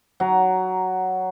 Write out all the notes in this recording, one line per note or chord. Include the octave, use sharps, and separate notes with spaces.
F#3 A#5